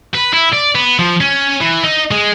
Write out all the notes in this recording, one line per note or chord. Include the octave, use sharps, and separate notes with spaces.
B4
E4
D5
B3
F3
C#4
E3
D#4
G#3